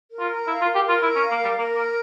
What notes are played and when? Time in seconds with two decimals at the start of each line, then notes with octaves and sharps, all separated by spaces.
0.10 A#4
0.19 F4
0.29 A#5
0.47 E4 F5
0.61 F4
0.65 A#4
0.75 G4
0.84 F4 A#4
1.03 E4 A#5
1.16 C#4
1.21 F5
1.31 A#3
1.40 G3 A#4
1.57 A#3 A#4
1.76 A#3 A#5